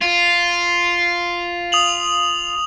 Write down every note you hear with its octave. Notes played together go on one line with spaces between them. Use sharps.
F4
D#6 F7 F#7